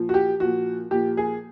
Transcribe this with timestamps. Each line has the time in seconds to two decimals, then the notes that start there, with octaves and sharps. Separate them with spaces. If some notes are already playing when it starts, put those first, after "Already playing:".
Already playing: A#2 F3
0.09 F#4
0.14 G4
0.40 A#2 F3 F#4
0.91 A#2 F3 G4
1.17 G#4